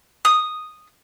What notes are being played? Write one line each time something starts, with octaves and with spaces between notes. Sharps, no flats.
D#6